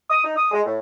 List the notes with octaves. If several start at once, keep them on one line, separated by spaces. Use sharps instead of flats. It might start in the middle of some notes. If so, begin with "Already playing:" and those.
D#6
D#4
D#6
G#3
A2